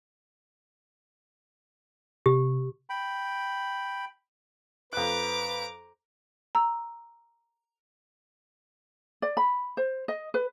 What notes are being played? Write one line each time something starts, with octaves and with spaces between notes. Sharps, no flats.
C3 G4
G5 B5
F2 B4 A#5 D6 F#6
A#5 E6
D5
B5
C5
D#5
B4